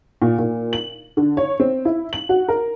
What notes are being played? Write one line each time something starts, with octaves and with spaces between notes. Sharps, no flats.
A#2
A#2
F#7
D3
C#5
C4
E4
F#7
F#4
A#4